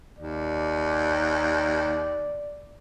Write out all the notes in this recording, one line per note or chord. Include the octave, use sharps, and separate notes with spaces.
D#2 D5